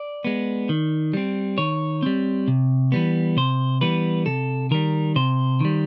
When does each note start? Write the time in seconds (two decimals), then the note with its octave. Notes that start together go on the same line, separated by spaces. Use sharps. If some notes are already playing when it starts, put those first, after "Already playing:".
Already playing: D5
0.24 G#3 B3
0.69 D#3
1.13 G3 C4
1.58 D#3 C#5
2.03 G3 C4
2.48 C3
2.92 E3 G3 B3
3.37 C3 C5
3.81 E3 G3 B3 B4
4.26 C3 A4
4.71 D#3 G3 A#4
5.16 C3 C5
5.60 D#3 G3